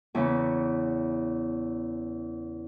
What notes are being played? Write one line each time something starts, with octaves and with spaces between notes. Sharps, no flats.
E2 C#3 E3 B3